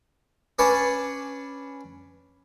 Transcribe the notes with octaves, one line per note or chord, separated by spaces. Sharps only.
C#4 D4 B4 G#5 A5 C#6